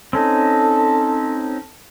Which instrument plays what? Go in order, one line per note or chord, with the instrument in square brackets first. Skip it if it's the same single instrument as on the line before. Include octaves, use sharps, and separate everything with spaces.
[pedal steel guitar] C4 C#4 D#4 [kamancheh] A4